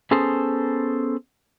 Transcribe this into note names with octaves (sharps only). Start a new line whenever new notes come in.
B3 C#4 G#4 A4 C5